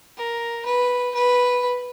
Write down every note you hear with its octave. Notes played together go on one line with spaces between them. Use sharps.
A#4
B4
B4